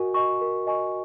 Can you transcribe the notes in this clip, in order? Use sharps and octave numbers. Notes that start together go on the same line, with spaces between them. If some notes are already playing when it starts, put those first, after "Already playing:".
Already playing: F#4 A#4 D#5 G#5 C#6
D#5 G#5 C#6
A#4
D#5 G#5 C#6